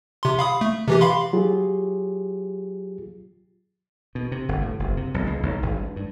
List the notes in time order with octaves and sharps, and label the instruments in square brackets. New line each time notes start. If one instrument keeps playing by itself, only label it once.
[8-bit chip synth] C3 C6
F5 B5 D#6
A3
C3 E3 G4
F5 B5 C6
[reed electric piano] F#3 F4 G4 G#4
[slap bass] B2
C3
G1
A2
F#1
C3
B1
C#2
B1
G#1
G2
G2